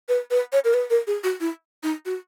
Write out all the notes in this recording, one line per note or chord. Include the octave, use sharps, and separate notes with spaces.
B4
B4
C#5
A#4
B4
A#4
G#4
F#4
E4
D#4
F#4